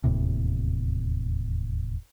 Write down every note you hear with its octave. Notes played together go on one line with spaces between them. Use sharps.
E1 D#2 A2 C3